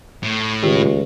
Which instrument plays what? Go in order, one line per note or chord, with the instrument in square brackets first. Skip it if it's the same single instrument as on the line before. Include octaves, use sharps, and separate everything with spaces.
[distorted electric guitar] A2
[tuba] C#2 [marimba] D#3 F4 [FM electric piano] G4